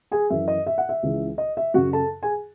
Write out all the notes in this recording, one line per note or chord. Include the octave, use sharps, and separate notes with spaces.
G#4 G#5
F#2 E3 E5
D#5
E5
F#5
E5
C#2 C#3 E3
D#5
E5
F#2 C#3 F#3 F#4 F#5
A4 A5
G#4 G#5